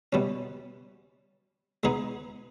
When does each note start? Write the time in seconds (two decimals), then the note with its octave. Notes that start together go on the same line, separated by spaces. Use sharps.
0.13 B2 G3 C#4
1.83 G#3 B3 D#4 G#4